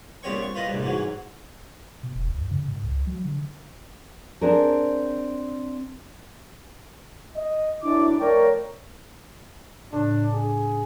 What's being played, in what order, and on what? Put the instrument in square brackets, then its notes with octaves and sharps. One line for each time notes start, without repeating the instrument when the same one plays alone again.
[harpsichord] A#1 G3 B3 C4 C#5 C#6
C#6
F4 B4 C5 D#5
A#1 C3 G3
G#2 E3 F#3
[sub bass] B2
D#1
D2
F#2
C#3
G#2
C#2
F#3
D3
[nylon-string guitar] C4 D4 G#4 A#4
[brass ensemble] D#5
[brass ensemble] F#2 E4 [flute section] D4 D6
[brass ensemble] F3 A3 C#5 [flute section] A#4 D5 G5
[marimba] A2 C#3 [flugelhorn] D4
[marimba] D4 [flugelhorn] G#4